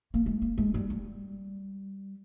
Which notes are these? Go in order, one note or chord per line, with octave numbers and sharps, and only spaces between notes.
A#3
G#3
A#3
G#3
G3
G3